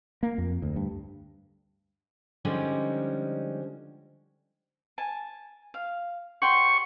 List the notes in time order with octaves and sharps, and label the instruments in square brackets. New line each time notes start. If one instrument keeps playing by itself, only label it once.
[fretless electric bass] A#3
F2
D2
G2
[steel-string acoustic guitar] D3 F3 G3 G#3 C#4 D#4
[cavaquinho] G#5 A5
F5
[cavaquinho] F#5 G5 C6 [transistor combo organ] C#6